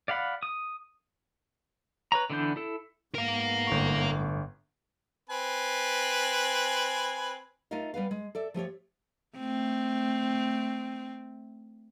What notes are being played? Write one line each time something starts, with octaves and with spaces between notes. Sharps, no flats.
D5 F5 F#5 B5
D#6
B4 C#5 A#5
D3 E3 B3 D4 G6
E4 A4
G#2 B3 A#4 F5
G1 A2 C#6
C4 B4 G#5
A3 D#4 F4 A#4 D#5 F5
G3 B3 B4 F5
G#3
A4 D5 E5
F3 A3 G4 C#5
A3 C4